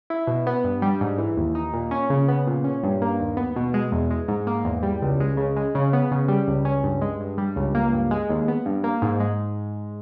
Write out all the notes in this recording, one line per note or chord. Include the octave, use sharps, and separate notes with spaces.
E4
B2
B3
G2
G3
G#2
E3
D#2
D#4
A#2
C#4
C#3
B3
A#2
C#4
G2
A#3
D#2
B3
B2
G#3
E2
G#3
G#2
A#3
E2
G3
C#2
G#3
C#3
G#3
C#3
B3
C#3
G3
C#2
C#4
G2
G#3
G2
G3
C#2
A#3
G2
G#3
D#2
B3
G2
A#3
G#2
G#3